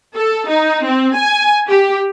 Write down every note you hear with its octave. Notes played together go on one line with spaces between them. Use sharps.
A4
D#4
C4
G#5
G4